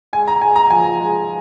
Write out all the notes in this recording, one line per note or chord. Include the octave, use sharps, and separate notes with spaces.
G#3 G#5
A#5
G#3 G#5
A#5
F3 G#5
G#3